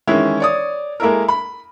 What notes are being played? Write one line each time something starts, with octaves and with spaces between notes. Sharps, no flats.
D#3 E3 G#3 C#4 E4
C#5 D5 D#6
G#3 A#3 E4 A4 A#4
B5